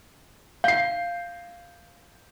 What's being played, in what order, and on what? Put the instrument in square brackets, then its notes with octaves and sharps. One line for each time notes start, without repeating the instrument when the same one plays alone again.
[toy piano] F5 [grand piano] G6 C7